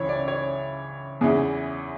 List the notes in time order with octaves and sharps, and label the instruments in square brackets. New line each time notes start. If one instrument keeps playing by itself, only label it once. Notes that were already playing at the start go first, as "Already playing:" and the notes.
Already playing: [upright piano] C#2 C#3 E3 C#5
D5
C#5
E2 C#3 E3 G#4